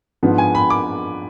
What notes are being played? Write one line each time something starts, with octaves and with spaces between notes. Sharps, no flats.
G#2 F3 B3 D4
G#5
B5
D6